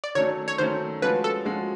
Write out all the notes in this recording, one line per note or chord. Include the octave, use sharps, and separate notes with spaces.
D5
D#3 F#3 A3 C#4 C#5
C#5
D#3 F#3 A3 C#4 C5
F3 G#3 C#4 F#4 B4
A4
F3 G#3 C#4 F#4